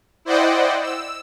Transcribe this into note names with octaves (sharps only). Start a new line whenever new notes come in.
E4 C5 D5 D#5 F#5 G5
E6